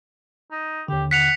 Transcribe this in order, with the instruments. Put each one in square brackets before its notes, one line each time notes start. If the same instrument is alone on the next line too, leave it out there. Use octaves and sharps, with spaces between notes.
[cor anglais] D#4
[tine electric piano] D#2 D3 [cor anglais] G4
[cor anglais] F#5 [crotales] B6 C#7 F7